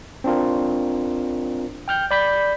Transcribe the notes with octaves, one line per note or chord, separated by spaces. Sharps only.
C4 D4 F4 A#4
G5 F6 G6
D5 B5 G6 B6